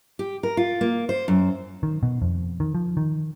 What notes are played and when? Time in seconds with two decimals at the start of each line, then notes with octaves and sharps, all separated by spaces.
0.19 G4
0.43 A#4
0.57 F4
0.81 A#3
1.09 C5
1.28 F#2
1.83 D#3
2.03 B2
2.22 F2
2.60 D#3
2.75 F3
2.97 D#3